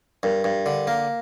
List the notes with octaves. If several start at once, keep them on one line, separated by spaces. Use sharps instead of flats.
G2 A#4
G2
D3
A#3